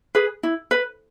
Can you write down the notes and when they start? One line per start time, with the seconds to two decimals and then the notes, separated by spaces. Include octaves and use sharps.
0.15 G#4 B4
0.43 E4
0.71 B4